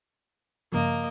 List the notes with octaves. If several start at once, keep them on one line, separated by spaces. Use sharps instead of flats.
G2 C#3 F3 A#3 D#5